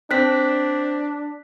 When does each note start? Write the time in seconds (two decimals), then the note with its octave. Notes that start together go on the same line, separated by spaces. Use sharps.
0.11 C4 D4 F#6 B6